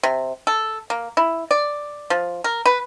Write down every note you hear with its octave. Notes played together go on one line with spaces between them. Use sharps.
C3
A4
A#3
E4
D5
F3
A#4
B4